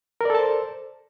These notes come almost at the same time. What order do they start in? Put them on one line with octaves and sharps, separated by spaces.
A#4 D5 A4 A5 C5